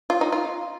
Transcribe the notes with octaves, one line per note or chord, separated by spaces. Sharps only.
F4
D#4
F4